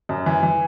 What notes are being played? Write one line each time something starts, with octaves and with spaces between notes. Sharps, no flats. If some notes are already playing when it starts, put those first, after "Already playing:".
F#2
E3
E3